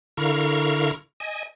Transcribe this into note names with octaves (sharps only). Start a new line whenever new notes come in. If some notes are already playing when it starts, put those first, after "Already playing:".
D3 E4 A#4 F5 A#5 C#6
D#5 G#5